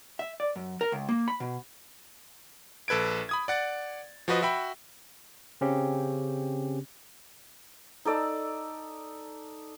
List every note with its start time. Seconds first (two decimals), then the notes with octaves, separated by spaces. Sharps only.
0.19 E5
0.40 D5
0.56 F#2
0.81 A#4
0.92 C#2
1.09 A#3
1.28 B5
1.40 B2
2.88 A#1 A4 B4 G#6 D7
3.29 B5 D#6 G#6
3.48 D5 F#5 A6
4.28 F3 F#4 B4 D#5
4.42 F#4 E5 G5 B5
5.61 C#3 C4 C#4 G4
8.05 D#4 A4 D5 E6